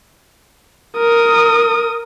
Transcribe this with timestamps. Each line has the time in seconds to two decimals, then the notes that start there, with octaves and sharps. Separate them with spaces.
0.97 A#4 D#6